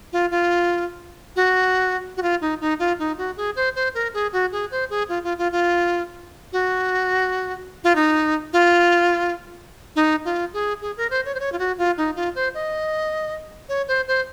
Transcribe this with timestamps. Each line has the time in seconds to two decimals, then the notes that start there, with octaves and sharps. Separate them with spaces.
0.13 F4
0.31 F4
1.36 F#4
2.17 F#4
2.22 F4
2.41 D#4
2.60 D#4
2.79 F4
2.99 D#4
3.18 F#4
3.37 G#4
3.56 C5
3.75 C5
3.94 A#4
4.14 G#4
4.33 F#4
4.52 G#4
4.71 C5
4.90 G#4
5.09 F4
5.24 F4
5.38 F4
5.52 F4
6.53 F#4
7.84 F4
7.95 D#4
8.53 F4
9.96 D#4
10.25 F4
10.53 G#4
10.82 G#4
10.97 A#4
11.11 C5
11.25 C#5
11.35 C5
11.40 C#5
11.52 F4
11.59 F#4
11.78 F4
11.97 D#4
12.16 F4
12.35 C5
12.54 D#5
13.69 C#5
13.88 C5
14.08 C5